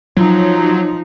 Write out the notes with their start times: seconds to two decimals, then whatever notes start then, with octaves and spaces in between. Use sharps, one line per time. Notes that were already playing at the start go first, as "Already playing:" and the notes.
0.17 F3 F#3 D#4